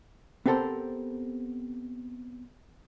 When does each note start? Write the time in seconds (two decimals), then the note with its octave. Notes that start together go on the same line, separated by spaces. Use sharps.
0.46 B3 C4 G4 A4 A#4 C5